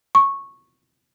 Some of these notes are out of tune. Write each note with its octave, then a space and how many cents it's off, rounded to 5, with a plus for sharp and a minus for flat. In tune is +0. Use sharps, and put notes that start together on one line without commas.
C#6 -10